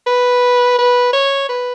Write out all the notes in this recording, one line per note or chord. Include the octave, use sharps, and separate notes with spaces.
B4
B4
C#5
B4